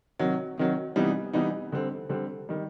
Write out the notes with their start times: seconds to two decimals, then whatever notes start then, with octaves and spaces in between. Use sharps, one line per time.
0.19 C3 D#3 F#3
0.58 C3 D#3 F#3
0.96 C3 E3 G3 B3 D#4
1.33 C3 E3 G3 B3 D#4
1.72 D3 G3 C4
2.09 D3 G3 C4
2.49 D#3 G3